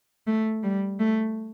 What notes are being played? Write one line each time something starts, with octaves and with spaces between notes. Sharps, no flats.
A3
G3
A3